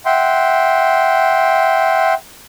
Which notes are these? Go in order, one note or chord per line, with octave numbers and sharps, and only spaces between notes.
E5 F#5 G5 C6